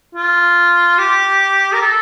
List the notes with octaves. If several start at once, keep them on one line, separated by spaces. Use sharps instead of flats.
F4
G4
A#4
A4